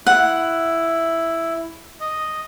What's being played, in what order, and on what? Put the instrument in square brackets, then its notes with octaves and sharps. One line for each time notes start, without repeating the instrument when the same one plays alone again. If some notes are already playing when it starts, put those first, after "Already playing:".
[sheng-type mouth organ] E4 [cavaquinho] F#5
[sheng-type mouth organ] D#5